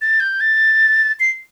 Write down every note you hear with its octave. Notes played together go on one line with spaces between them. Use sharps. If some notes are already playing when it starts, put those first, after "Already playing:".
A6
G6
A6
C7